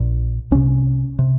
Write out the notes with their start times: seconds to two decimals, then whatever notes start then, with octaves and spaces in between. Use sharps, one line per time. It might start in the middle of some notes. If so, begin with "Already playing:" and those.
Already playing: A#1 A#2
0.51 C2 C3 C#4
1.19 C3